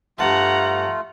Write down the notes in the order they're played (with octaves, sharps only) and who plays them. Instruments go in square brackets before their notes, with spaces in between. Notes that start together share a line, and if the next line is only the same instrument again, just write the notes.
[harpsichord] G2 A5 [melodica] A3 F4 [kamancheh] F#5 A#5